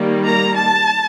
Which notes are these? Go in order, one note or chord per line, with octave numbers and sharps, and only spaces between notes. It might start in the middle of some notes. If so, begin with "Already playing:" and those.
Already playing: D#3 G3 A#3
A#5
A5